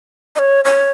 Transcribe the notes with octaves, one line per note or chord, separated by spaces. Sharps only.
D#5
C#5
C#5